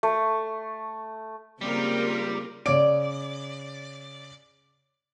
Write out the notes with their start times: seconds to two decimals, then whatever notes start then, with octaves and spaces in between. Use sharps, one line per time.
0.03 A3
1.61 C#3 G3 A#3 C4 F4 G4 A#4
2.66 C#3 C#5 D5 D7